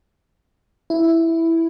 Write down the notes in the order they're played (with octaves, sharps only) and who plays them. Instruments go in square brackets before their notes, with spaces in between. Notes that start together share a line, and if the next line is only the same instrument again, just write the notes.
[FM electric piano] E4